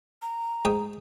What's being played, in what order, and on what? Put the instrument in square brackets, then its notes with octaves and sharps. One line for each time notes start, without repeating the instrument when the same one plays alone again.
[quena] A#5
[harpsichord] G#2 G5 D#6